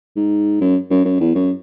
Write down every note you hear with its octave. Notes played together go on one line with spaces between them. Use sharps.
G#2
F#2
F#2
F#2
E2
F#2